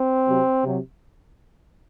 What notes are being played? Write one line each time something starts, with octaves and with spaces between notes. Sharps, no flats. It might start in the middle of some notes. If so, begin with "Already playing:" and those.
Already playing: C4
C3 F#3
C3 F#3